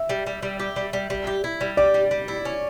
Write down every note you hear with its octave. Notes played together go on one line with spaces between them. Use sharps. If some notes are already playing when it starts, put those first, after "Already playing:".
Already playing: E5
G3
G3
G3
G4
G3
G3
G3
G4
E4
G3
G4 D5
G3
G3
E4
C#4